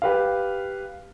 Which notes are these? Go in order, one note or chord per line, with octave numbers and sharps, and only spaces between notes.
G4 B4 F5